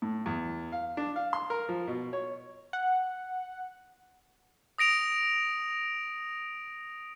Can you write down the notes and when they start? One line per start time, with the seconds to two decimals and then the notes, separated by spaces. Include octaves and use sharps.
0.02 A2
0.26 E2
0.72 F5
0.97 D4
1.16 F5
1.33 C6
1.50 A#4
1.69 F3
1.87 B2
2.13 C#5
2.73 F#5
4.78 D#6 A#6 D7 F7